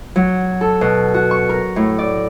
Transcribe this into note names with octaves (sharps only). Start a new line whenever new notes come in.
F#3
A4
B2
F#4
C#6
A#4
A2
D5